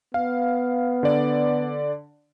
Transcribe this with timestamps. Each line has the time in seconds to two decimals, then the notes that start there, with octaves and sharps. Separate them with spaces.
0.14 B3 F5
1.03 D3 D5